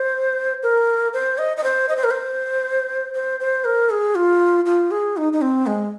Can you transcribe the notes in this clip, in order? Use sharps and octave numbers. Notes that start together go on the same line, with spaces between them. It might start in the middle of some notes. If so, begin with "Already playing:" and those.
Already playing: C5
A#4
C5
D#5
D#5
C5
D#5
C5
A#4
C5
C5
C5
A#4
G#4
F4
F4
G#4
D#4
D#4
C4
G#3